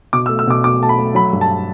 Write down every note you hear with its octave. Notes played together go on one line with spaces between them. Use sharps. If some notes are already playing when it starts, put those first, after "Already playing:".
B2 D6
E6
A3
E6
B2 D6
B2 D6
A3 A5
B5
A3
F#3 B5
G2
A5